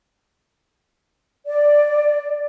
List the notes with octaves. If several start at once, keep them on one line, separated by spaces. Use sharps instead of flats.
D5